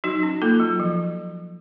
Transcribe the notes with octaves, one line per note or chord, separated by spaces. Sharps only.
F#3 D#4 F#4
C#4
A#3 F4 A4
F#3
F3